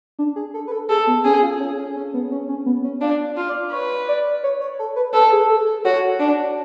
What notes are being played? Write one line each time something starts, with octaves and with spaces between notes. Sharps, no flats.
D4
G#4
A4
B4
A4
G#4 A4
B3
C#4 G#4
F4
C#4
C#4
C#4
B3
C#4
C#4
B3
C#4
D4 F4
F4
D5
B4 C#5
D5
C#5
C#5
A4
B4
A4 B4
G#4
A4
A4
F#4 C#5
D4